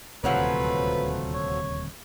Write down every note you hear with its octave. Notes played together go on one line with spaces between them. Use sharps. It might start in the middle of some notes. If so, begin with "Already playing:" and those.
D#1 D2 C3 F3 F#3 A3 B4
C#5